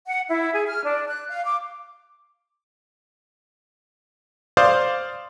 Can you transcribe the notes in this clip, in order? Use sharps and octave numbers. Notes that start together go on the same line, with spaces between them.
F#5
E4
G#4
F6
D4
F#6
F5
D6
C5 D5 F5 D6 D#6 G6